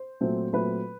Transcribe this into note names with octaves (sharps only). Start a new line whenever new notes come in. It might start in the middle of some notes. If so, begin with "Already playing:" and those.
Already playing: C5
A#2 F#3 A3 C4
A#2 F#3 A3 C4 B4